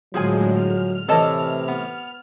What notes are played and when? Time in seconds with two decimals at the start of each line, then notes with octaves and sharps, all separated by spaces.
0.14 A2 D3 F3 F#3 G#3 G#4 G#5
0.53 F6
1.09 A2 C3 E3 A4 D#5 A5
1.68 B3